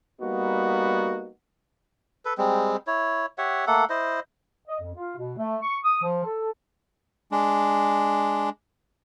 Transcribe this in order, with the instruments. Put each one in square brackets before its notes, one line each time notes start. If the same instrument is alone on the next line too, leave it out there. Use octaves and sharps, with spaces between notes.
[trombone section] G3 A#3 B3 D#4 F#4
[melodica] A4 B4
G3 G#3 C4
E4 C#5
G4 C#5 E5 F#5
A3 A#3 A4 F#5
E4 C5 D#5
[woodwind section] D#5
F2
F4
B2
A3
C#6
D#6
F3
A4
[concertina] G#3 D4